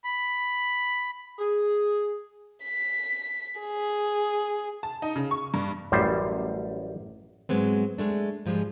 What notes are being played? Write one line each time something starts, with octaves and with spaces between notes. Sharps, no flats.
B5
G#4
B6
G#4
A5
D#4
C#3
C#6
G2
A1 F#2 G3 C5
G#2 B2 F#3 G#3 B3 C4
G#3 A3 D4
G#2 F3 G3 G#3